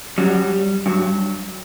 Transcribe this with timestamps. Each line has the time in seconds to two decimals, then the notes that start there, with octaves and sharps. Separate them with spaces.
0.18 F#2 F#3 G3
0.86 G2 F#3